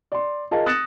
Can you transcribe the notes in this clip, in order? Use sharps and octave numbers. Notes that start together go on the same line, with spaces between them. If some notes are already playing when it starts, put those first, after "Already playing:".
D5 C6
F4 G#4 A#4 D#5 F5 A5
D#6 F#6 A6 A#6 C#7 E7